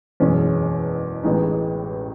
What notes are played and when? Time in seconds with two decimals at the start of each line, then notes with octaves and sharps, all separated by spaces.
0.20 F#1 E2 B2 G#3 C#4
1.24 A1 A2 G#3 B3 D#4